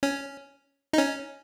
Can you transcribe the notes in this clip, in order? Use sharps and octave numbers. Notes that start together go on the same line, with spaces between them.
C#4
D#4
C#4